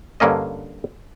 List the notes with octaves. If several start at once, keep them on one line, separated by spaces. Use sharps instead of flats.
G2 D3 A#3 C#4 D#5